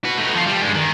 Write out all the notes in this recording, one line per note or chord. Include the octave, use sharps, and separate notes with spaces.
F#4 B4
A3 D#4
F3 F4
G3
G2 G#3
D#3